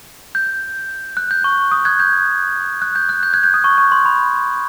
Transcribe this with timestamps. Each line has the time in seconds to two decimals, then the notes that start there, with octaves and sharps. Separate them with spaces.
0.35 G6
1.17 F#6
1.31 G6
1.44 C#6
1.71 D#6
1.85 F#6 G#6
2.00 G6
2.82 F#6
2.95 G6
3.09 F#6
3.23 G6
3.33 F#6 G#6
3.44 G6
3.54 D#6
3.64 C#6
3.78 C#6
3.92 C6
4.06 B5